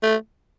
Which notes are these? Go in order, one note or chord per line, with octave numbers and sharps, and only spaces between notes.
A3